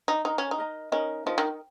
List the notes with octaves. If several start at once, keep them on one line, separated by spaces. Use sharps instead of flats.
D#4
D#4 A#4 D#5 A#5
C#4
D#4
A#4 D#5 A#5
C#4 D#4 A#4 D#5
F3 D#4 A#4 D#5
D#3